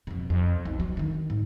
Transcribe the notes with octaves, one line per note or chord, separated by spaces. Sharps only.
F2 B2
F2
B1
F#3
D3 D#3
G#2